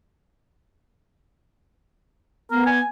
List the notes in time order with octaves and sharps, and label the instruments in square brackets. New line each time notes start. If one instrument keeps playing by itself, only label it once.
[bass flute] B3 [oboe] A#4
[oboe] G#5